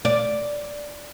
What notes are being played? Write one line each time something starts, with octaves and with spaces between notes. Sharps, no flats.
D5